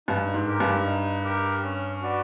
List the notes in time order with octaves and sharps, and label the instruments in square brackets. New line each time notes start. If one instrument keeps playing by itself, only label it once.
[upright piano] G2 [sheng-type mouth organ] D#4
[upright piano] G#2
[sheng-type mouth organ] G4 A#4
[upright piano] G2
[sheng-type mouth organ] D#4
G4 A#4
C#4
F#4 B4 D5